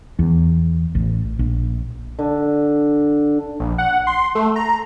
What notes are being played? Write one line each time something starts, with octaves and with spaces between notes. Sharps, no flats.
E2
A1
A#1
D3
A#1
F#5
C6
A3
A#5